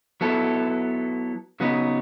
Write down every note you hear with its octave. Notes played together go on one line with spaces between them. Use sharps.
F#3 B3 E4 A4
C#3 F#3 B3 D#4